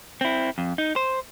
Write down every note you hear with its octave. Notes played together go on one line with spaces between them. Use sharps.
C4 E4
F2
D#4
C5